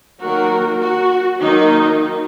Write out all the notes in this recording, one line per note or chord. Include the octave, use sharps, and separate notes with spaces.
D#3 F#3 A#3 F#4 A#4
F#4
D#3 F#3 A#3 D#4